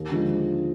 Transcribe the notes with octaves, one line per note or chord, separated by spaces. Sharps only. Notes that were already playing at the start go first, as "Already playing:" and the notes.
Already playing: D#2 G#4
D3 F3 G#3